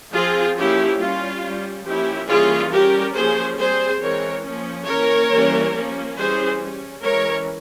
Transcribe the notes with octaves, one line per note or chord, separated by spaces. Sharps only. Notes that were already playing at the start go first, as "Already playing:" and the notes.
F3 C4 F4 G#4
F3 A#3 C#4 E4 G4
G3 C#4 F4
G3 C#4
F3 A#3 C#4 E4 G4
E3 G3 A#3 C#4 F4 G#4
G3 C#4 G4 A#4
F3 A#3 C#4 G#4 C5
G3 C4 G#4 C5
E3 G#3 C4 A#4 C#5
F3 A#3 C#4
E3 A#3 C#4 A#4 C#5
E3 G3 A#3 C#4
F3 A#3 C#4
E3 G3 C#4 G#4 C5
G3 C#4
E3 G#3 C#4 A#4 C#5